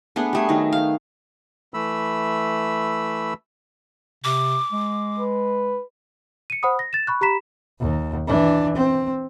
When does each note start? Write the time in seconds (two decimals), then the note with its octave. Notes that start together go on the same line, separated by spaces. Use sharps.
0.16 A3 B3 D4 G#4
0.33 G3 A3 G#4
0.49 D#3 F#3 D#4
0.73 F5
1.74 E3 A3 B5 E6
4.24 C3 D6
4.72 G#3
5.19 B4
6.50 C#7 D#7
6.63 C5 F#5 B5 D#6
6.79 A#6
6.93 A6 E7
7.07 B5 C#6 F#6
7.21 G4 A#5 B5 B6 E7
7.80 D#2
8.27 E3 D4
8.76 C4